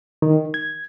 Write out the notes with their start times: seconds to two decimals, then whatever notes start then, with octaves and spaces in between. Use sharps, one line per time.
0.22 D#3
0.54 G#6